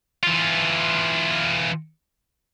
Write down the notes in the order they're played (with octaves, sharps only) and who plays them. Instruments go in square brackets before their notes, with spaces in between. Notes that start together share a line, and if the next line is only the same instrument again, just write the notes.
[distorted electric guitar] E3 F4